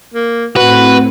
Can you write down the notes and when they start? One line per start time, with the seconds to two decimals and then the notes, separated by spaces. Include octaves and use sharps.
0.14 A#3
0.56 A2 C4 F#4 B4